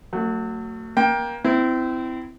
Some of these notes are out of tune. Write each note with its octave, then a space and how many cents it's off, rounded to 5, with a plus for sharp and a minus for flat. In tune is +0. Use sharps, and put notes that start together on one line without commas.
F#3 +0 A3 +40
A#3 +25 G5 +10
C4 -25 E4 +0